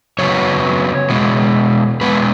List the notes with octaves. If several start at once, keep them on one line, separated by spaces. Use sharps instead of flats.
F#2 C#3 F#3 B3 C#5
B2 G#3 B3
B2 G#3 B3 B4